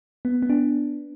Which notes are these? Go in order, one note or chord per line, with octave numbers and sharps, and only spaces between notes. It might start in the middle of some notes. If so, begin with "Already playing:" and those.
B3
B3
D4